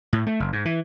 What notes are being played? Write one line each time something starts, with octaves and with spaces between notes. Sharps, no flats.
A2
A3
F#1
G#2
E3